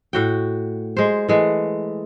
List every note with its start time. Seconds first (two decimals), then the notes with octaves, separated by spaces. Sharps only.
0.13 A2 F#4 G5
0.97 G#3 C5
1.28 E3 G#3 A3